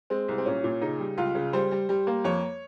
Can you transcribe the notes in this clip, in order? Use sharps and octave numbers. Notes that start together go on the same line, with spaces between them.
G#3 C4
C2
C4
A#2 C#4
A#2
C#3 D#4
G3
C#2 F4
C#3
G3 C5
G3
G3
A#3
F2 C#5